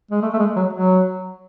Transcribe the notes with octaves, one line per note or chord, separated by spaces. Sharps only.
G#3
A3
A3
G#3
F#3
F#3